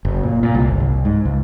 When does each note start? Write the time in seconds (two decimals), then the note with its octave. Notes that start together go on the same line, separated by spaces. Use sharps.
0.05 F#1
0.23 A#2
0.43 A#2
0.55 C2
0.68 G1
0.80 C2
1.05 G#2
1.26 C#2